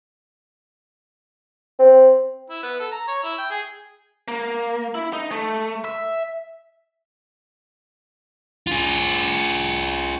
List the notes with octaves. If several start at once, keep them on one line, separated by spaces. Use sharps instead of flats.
C4
E4
B3
A4
A#5
C#5
E4
G5
G#4
A#3
E4
D#4
A3
E5
F4 G#4